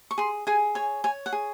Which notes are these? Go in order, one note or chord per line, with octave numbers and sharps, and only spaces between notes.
C#6
G#4 C6
G#4 G#5
C#5 G#5
C#5 G#5
F#5
G#4